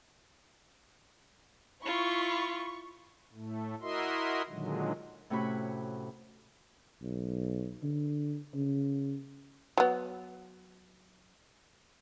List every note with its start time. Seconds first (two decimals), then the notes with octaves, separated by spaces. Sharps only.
1.84 E4 F4 B5 C#6
3.33 A2 A3
3.81 E4 F#4 A#4 D#5 E5 C6
4.49 A#2 D3 D#3 F#3 G#3
5.30 A2 C3 C#4 F#4 B5 C#6
7.02 B1
7.83 D3
8.54 C#3
9.78 F#3 B3